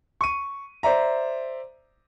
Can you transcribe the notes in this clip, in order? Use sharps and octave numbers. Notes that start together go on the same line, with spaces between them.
C#6 D#7
C5 D5 E5 A#5